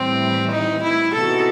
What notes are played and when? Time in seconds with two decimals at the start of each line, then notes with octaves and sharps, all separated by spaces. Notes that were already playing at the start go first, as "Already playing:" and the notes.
Already playing: A2 E3 G3 C4
0.51 D#4
0.82 E4
1.13 C3 E3 B3 D#4 F#4 A4